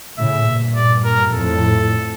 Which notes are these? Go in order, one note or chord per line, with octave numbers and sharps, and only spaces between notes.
A2 C#3 E5
G2 A#2
D5
A#4
F2 A2 A4